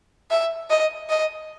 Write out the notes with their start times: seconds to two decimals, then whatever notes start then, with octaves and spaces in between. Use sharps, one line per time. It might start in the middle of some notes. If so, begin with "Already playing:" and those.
0.31 E5
0.70 D#5
1.09 D#5